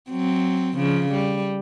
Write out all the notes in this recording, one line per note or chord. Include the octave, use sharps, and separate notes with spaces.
F#3 C4
C#3 F3
G3